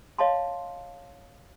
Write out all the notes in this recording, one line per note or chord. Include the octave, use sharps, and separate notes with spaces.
C#5 D#5 F5 A5 C6